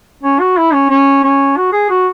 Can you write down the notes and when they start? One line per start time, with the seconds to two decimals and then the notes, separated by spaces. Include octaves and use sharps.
0.23 C#4
0.40 F#4
0.58 E4
0.73 C#4
0.90 C#4
1.23 C#4
1.57 F#4
1.73 G#4
1.90 F#4